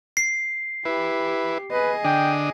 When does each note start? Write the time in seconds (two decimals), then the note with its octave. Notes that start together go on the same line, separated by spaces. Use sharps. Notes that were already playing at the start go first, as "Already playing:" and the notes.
0.17 C7
0.85 E4 G4 B4
1.72 G#4 B4 D#5
2.04 D3 D4 G5 D#6